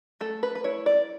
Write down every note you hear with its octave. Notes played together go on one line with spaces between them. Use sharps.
A3 A4
B4
B4
E4 C#5
D5